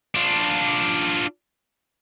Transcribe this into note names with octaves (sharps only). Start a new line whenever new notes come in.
D4 F4